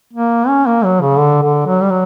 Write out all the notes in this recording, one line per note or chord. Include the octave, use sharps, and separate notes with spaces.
A#3
C#4
A#3
F#3
C#3
D3
D3
F#3
G3
F#3